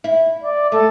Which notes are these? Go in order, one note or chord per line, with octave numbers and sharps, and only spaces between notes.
E4
D5
A3 A4